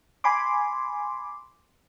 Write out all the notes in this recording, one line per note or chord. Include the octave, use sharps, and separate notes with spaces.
G#5 B5 C6 D6